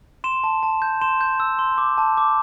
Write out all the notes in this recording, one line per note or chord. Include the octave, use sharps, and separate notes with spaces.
C6 E7
A5
A5
G6
C6 E7
G6
E6
C6
D6
A5
D6